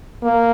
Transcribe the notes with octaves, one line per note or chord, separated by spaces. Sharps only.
A#3